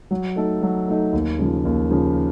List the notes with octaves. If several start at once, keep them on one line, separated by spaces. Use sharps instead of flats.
F#3
A3 D#4 A4
F#3
A3 D#4 A4
D#2
C#3 F3
D#2
C#3 F3